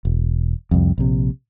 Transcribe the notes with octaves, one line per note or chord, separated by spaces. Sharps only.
E1
C2 F2
A#1 C3